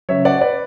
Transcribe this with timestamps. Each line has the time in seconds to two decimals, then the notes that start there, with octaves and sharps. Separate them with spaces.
0.09 C#3 F#3 C#5 E5
0.25 D5 F#5
0.41 B4 D5